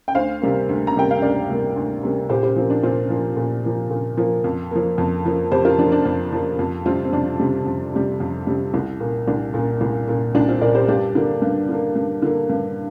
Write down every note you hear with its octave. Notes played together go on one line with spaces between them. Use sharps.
G5
D2 C5 F5
C3 G3 A#3
D2
A#5
C3 G3 A#3 G5
F5
D2 A#4 D5
C3 G3 A#3
D2
C3 G3 A#3
A#2 G4 C5
G4 C5
F3 A#3 C4
D4
A#2 C4 F4
F3 A#3
A#2
F3 A#3
A#2
F3 A#3
F2
F3 A#3
F2
F3 A#3
F2 G4 C5
F4 A#4
F3 A#3 D4
D4
F2
F3 A#3
F2
C3 G3 C4 F4
C4
F2 D4
C3 G3
F2
C3 G3
F2
C3 G3
C2
A#2 A#3
C2 D4
A#2 A#3
C2
A#2 A#3
C2 D4
C4 F4
A#2 A#3 A#4 D5
G4 C5
G2 D4 G4
D3 A#3
G2
D3 A#3
G2
D3 A#3
G2